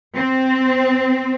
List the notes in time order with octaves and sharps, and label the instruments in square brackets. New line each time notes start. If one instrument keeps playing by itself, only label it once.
[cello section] C4